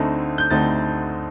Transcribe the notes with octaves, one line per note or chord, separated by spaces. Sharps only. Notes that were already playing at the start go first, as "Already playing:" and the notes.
Already playing: D2 D3 A3 C4 D#4
G6
D2 D3 A3 C4 D#4 A6